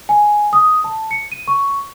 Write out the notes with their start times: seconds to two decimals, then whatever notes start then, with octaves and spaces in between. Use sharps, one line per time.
0.09 G#5
0.53 D#6
0.84 A5
1.11 C#7
1.32 D#7
1.48 C#6